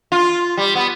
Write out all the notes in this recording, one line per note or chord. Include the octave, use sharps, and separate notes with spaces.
F4
G3
B3